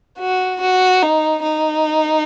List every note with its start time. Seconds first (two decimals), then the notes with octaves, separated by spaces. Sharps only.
0.19 F#4
0.61 F#4
1.02 D#4
1.43 D#4